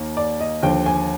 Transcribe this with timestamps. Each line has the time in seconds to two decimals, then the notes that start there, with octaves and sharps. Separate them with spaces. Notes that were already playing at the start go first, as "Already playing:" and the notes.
Already playing: D#2 D#3 A#3
0.17 D5
0.40 D#5
0.63 D#2 D3 F3 G5
0.86 G#5